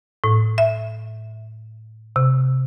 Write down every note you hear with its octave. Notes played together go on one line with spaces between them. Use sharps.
A2
E5
C3